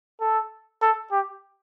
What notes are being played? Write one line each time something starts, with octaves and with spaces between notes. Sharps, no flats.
A4
A4
G4